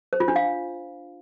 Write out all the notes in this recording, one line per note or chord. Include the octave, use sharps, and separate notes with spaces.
C5
F4
D4
F5